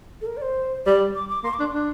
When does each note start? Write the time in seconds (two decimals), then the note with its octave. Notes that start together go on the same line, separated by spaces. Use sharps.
0.21 A4
0.27 A#4
0.37 D5
0.42 C5
0.86 G3 D5
1.15 D6
1.29 D6
1.44 A#3 C6
1.54 D6
1.59 D4
1.63 C6
1.74 D4